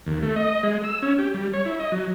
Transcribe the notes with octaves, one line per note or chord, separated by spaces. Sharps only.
D#2
A3
D#5
G#3
E6
C#4
G4
G3
C#5
E4
D#5
F#3